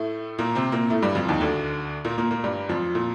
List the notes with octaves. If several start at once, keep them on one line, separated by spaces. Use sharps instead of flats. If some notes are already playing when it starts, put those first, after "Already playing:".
Already playing: A2 A3
A#2 A#3
C3 C4
A#2 A#3
A2 A3
G2 G3
F2 F3
D#2 D#3
D2 D3
A#2 A#3
A#2 A#3
A#2 A#3
G2 G3
F2 F3
A#2